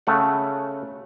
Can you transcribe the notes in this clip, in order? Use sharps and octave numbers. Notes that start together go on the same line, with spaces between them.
C#3 A3 F#5